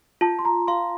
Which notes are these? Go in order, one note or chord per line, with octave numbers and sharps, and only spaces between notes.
F4 A5
C6
A#5
F5 C6